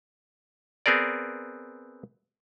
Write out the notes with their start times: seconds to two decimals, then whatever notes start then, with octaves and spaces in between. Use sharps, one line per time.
0.86 B3 C4 G#4 A#4 D5